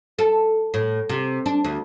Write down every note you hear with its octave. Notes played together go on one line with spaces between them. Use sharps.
A4
A2
C3
D4
D2